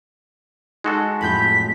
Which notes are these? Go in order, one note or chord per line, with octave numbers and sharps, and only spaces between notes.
G#3 D#4 F#4 A4
F2 A2 F#3 B5 G6 B6